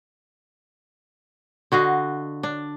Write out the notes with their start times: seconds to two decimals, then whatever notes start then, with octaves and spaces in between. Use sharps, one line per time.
1.72 D3 F#4 D#5 F5
2.43 D4